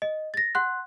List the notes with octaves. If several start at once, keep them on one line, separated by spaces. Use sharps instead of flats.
D#5
A6 A#6
F#5 C6 F#6